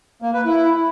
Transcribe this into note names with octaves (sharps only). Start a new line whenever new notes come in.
A#3
B4
E4